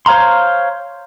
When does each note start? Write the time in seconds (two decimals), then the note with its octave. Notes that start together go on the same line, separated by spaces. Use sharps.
0.06 C5 C#5 F5 A#5 C6